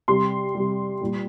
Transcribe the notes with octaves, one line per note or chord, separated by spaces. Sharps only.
C3 G3 C6
C3 G3
A#2 G3